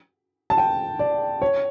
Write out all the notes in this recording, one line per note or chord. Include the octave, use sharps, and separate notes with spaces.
A5
G5
D5
C#5